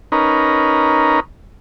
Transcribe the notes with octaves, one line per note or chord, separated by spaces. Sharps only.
C#4 D#4 A#4 B4